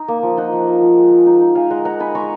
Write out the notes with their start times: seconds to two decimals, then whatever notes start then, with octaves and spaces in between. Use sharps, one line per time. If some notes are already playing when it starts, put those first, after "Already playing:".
Already playing: D#4
0.08 A#3
0.23 F3
0.37 D#4 D#5 F#5
0.53 F3
0.67 A#3
0.82 F3
0.97 G#3
1.11 G#3
1.26 D#4
1.40 D#4
1.55 G#3 F5 G#5
1.70 G#3 F#5 A#5
1.85 D#4 F#5 A#5
2.00 D#4 G#5 B5
2.15 G#3 A#5 C#6